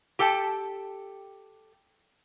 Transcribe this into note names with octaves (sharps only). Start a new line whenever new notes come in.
G4 A4 G5 A5